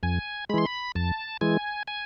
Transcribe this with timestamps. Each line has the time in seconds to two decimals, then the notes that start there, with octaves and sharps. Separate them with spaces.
0.03 F2 G#5
0.49 G#3 B5
0.54 E3 C6
0.65 B5
0.95 F2 A5
1.41 E3 G#3 G#5
1.88 G#5